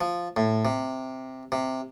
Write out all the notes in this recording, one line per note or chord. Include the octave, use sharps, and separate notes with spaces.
F3
A2
C3
C3